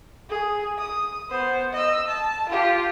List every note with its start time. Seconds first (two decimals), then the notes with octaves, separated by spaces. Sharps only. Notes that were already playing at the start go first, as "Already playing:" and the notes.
0.30 G#4
0.79 D#6
1.30 B3 C5
1.73 D#5 E6
2.08 A5
2.49 F4 G4